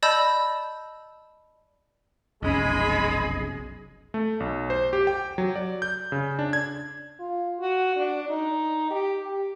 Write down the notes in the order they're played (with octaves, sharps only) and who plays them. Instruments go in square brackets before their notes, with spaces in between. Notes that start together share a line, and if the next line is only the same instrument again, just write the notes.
[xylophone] D5 D#5 A5 B5 E6 G6
[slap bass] F1 B1 [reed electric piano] F#2 C#4 [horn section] G#3 B5 [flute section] G#4 D#5
[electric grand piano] A3
B1
C5
G4
G5
F#3
D5
G6
C#3
D4
G#6
[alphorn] F4
F#4
D4
D#4
G4
G4